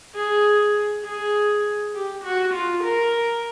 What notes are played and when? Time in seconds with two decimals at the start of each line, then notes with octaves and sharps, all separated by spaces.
0.15 G#4
1.04 G#4
1.94 G4
2.24 F#4
2.53 F4
2.83 A#4